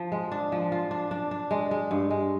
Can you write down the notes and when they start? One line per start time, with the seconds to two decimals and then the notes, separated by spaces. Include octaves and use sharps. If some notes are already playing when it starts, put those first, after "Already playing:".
Already playing: F3
0.12 G#3
0.32 D4
0.52 F3
0.72 F4
0.91 D4
1.11 D4
1.31 D4
1.51 G#3
1.71 G#3
1.91 G2
2.10 G#3